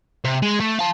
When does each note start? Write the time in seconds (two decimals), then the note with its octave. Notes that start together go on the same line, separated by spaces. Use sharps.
0.24 C3
0.42 G#3
0.60 A3
0.79 F5 A5